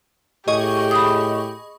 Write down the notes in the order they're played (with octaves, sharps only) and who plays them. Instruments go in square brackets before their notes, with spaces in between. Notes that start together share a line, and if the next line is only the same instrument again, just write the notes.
[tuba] A2 [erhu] G4 [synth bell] G#4 D#5 C#6
[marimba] B5 D#6